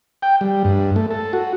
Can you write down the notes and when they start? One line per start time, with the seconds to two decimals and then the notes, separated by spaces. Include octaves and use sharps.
0.22 G5
0.41 G3
0.64 G2
0.96 A3
1.11 A4
1.33 F#4